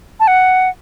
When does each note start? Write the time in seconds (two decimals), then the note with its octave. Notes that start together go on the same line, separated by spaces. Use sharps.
0.20 A5
0.27 F#5